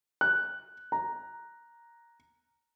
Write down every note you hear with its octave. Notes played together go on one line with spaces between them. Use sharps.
F#6
A#5